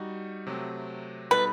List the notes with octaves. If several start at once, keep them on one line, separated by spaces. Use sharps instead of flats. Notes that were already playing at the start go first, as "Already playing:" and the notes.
Already playing: G3 D#4 F#4
C3 F#3 A3 C4
B2 G3 D#4 A4 B4